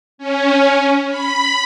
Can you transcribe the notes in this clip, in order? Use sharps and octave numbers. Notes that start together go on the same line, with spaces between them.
C#4
B5